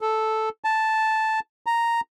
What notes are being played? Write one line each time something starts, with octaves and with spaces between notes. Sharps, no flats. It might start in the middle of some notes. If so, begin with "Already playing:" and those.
A4
A5
A#5